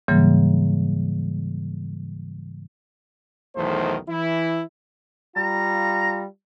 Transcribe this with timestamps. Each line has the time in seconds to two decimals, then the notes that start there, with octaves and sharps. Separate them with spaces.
0.08 G#2 C#3 E3 F#3 G3 A#3
3.56 B1 E2 D#3 A3 C5
4.08 E3 E4
5.36 G3 F4 A#5